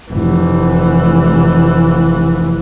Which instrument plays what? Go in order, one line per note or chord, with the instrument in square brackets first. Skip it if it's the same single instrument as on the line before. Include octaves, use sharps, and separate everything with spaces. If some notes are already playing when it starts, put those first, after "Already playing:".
[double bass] F1 E3